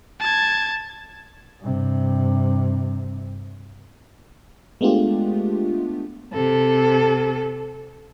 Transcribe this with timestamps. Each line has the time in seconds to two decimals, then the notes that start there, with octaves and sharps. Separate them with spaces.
0.20 A5 G#6
1.61 G2 C3
4.81 G#3 A3 B3 D4 F4 G4
6.31 C3 A4